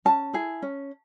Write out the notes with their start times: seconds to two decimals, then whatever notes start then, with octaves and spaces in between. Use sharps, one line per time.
0.05 C#4 A5
0.33 E4 G#4
0.62 C#4